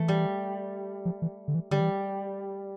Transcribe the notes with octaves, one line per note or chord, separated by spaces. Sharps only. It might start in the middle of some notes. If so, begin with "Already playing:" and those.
Already playing: E3 A3
G3
F3
E3
D3
E3
D3 G3
E3